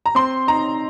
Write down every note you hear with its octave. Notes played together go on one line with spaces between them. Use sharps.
A#5
C4 C6
D#4 A#5